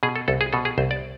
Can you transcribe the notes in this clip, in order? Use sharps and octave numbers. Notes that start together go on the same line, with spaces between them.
B2 G#4
A4
C2 A4
G#4
B2 A4
G#4
C2 C5
D5